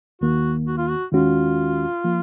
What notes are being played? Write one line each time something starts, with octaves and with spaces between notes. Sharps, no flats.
D#2 D#3 A#3 F#4
F#4
F4
F#4
D#2 D#3 G#3 C#4 F4 F#4
F3 A#3